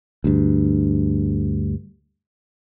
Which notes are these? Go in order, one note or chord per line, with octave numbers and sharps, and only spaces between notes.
D2 G2